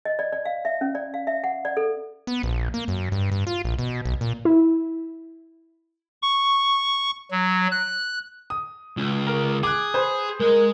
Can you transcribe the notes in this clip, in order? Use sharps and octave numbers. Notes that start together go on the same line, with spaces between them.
D#5
D5
D5
F5
E5
C#4
D5
F5
E5
F#5
D5
A4
B3
A#1
A#3
F#2
G2
G2
F4
A#1
B2
B1
A#2
E4
C#6
F#3
F#6
D#6
C#2
A#4
G#4 D6 F#6
B4 C5
G#3 A#4 D#5